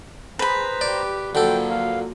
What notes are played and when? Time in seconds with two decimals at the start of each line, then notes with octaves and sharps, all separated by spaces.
0.39 G#4 B4 C5 A#5 B5
0.81 G4 D5
1.35 D3 F3 F#3 A#3 A4 G5
1.70 F5